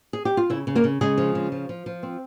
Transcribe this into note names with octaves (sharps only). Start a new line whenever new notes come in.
G#4
G4
F4
C#3 E4
C#3
A#3 A#4
C#3
C#3 G#3 G#4
F3
C#3
F3
F3
F3
C4